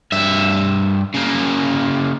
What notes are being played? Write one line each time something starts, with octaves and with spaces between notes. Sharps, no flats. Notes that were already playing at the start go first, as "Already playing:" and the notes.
G2 E5
C#3 A#3